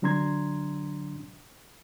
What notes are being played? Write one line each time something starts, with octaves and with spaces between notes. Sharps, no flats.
D3 F#3 D4 A#5 C6 G#6